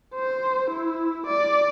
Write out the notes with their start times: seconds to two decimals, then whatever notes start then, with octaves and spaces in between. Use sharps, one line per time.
0.15 C5
0.71 E4
1.26 D5